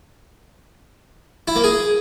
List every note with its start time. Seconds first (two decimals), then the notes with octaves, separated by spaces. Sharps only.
1.48 E4
1.56 A#3
1.64 G#4